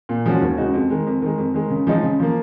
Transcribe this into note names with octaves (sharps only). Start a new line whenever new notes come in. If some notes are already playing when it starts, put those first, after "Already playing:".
A#2
F3 G#3 C#4 F#4
D#2
C#3 G#3 D#4 F#4
F2
D#3 G#3
F2
D#3 G#3
F2
D#3 G#3
C#3
F3 G#3 D#4 G#4
C#3
F3 A#3